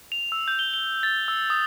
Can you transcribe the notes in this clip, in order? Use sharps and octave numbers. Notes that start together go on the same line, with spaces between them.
F7
E6
G6
G7
G7
A6
E6
D#6